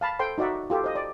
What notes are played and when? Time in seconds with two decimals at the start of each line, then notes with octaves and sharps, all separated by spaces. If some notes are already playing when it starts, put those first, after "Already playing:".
0.01 F5 A5 B5
0.19 A4 C5 G5 C6
0.38 D#4 F#4 D5 E5 F#5
0.70 F4 G4 A4
0.84 C5 D#5
0.95 D5